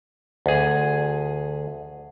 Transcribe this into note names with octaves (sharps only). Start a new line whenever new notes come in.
D2 G#4